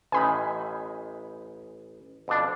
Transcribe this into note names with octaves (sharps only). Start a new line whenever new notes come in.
A1 D#4 G#5 B5
F2 B2 D4